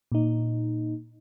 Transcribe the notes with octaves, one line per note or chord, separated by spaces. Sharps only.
A#2 D#4